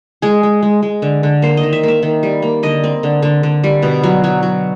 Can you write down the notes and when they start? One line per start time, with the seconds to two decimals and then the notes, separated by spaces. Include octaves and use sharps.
0.22 G#3 G#4
0.43 G#3
0.63 G#3
0.83 G#3
1.02 D3
1.23 D3
1.42 A#3 C5
1.57 D#5
1.63 D#3
1.73 E5
1.83 A#3 E5
2.03 D#3
2.23 G3
2.42 A#3
2.63 D3 D#5
2.84 C4
3.03 D3
3.22 D3
3.43 D3
3.64 G3
3.83 B2
4.03 F#3
4.24 F#3
4.43 F#3